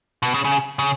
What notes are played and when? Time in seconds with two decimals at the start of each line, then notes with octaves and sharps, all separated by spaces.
0.23 B2
0.34 C#3
0.45 C#3
0.79 C#3